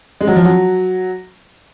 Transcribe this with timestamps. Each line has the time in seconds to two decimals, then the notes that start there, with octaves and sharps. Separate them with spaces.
0.21 G#3
0.27 F#3
0.36 F3
0.44 F#3